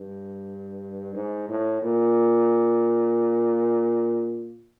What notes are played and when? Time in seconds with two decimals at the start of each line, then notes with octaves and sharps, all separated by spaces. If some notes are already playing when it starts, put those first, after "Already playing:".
Already playing: G2
1.15 G#2
1.49 A2
1.83 A#2